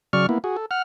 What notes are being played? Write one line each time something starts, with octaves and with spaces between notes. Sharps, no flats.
C#3 F#3 D5 C#6 F6
A#3 B3 E4
F#4 G#4
A4
F#5 F6